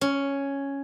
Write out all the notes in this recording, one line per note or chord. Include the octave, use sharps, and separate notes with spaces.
C#4